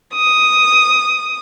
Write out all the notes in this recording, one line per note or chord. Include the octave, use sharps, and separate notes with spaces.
D#6